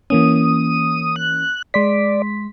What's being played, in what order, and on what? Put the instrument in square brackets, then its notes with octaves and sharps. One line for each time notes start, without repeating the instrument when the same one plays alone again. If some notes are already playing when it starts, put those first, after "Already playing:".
[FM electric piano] E3 A#3 C#4 [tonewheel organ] D#6
[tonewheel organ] F#6
[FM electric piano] G#3 C6 B6 [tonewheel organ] D5